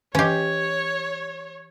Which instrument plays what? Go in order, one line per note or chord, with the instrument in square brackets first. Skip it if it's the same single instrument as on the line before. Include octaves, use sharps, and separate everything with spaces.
[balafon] E3 D#5 [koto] C#4 G4 [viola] C#5